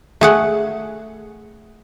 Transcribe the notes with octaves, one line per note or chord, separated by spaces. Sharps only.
A3 G#4 F#5